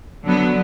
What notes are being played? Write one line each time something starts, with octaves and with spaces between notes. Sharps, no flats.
D3 F#3 B3